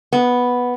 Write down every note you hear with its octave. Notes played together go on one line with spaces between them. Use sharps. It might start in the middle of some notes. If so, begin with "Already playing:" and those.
B3